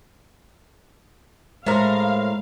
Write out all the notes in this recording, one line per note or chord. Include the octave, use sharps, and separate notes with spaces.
A2 G#3 A#4 C5 E5 F5 C6